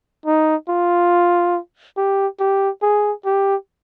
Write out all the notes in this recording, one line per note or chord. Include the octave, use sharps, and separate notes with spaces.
D#4
F4
G4
G4
G#4
G4